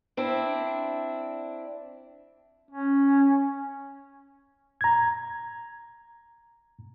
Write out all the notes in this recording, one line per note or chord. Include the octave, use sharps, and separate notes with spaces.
C4 D4 E4
C#4
A#5 G#6